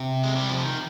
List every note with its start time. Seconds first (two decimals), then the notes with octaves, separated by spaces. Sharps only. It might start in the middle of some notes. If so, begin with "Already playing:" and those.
Already playing: C3
0.23 G#3
0.36 G3
0.49 F3
0.64 D#3